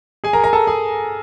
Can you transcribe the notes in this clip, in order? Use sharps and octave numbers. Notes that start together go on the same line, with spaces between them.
G#4 G#5
A#4 A#5
A#4 A#5
A4 A5
G#4 G#5